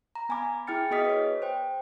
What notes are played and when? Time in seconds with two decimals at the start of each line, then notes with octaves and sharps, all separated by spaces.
0.15 A#5
0.29 B3 G#5 B5 D6
0.67 E4 G#4 G5 F6 A6 C#7
0.91 B3 F#4 G#4 D#5 D#6 B6
1.05 B4 C#5
1.42 C5 G5